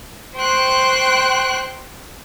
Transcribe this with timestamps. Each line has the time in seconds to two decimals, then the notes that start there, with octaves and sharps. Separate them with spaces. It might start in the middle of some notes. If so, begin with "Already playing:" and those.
0.36 C5 G5 C6 C#6 F#6